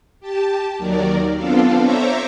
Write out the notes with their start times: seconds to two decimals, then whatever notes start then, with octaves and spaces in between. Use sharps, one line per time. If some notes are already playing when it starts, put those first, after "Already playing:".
0.20 G4 A5
0.78 D#2 D#3 F#3 A#4 D5
1.36 B3 C4 D4 F4 A4 F5
1.82 C5 C#5 E5 A#5 C#6 D6